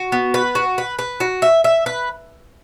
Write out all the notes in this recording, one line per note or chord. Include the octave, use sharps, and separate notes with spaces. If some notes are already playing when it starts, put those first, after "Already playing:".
Already playing: F#4
B3
B4
F#4
B4
B4
F#4
E5
E5
B4